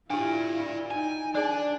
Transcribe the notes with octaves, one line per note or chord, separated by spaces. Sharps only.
D4 E4 F4 G4 D5 F5
D#4 G5 G#5
D4 D#4 G#4 D5 A5